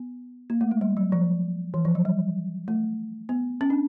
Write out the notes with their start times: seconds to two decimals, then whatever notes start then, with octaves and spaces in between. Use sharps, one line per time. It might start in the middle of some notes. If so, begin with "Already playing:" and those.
Already playing: B3
0.50 A#3
0.61 A3
0.71 G#3
0.81 G3
0.97 F#3
1.12 F3
1.74 E3
1.85 F3
1.95 F#3
2.05 G3
2.68 A3
3.29 B3
3.61 C#4
3.70 D4